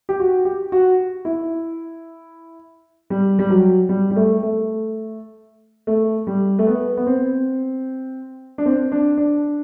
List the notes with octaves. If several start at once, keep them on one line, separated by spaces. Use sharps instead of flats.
G4
F#4
G4
F#4
E4
G3
G3
F#3
G3
G3
A3
A3
A3
G3
A3
B3
B3
C4
D4
C4
D4
D4